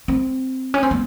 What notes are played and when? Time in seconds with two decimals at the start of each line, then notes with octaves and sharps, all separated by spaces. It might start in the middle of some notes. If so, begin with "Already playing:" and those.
0.08 C4
0.74 C#4
0.83 C4
0.91 B3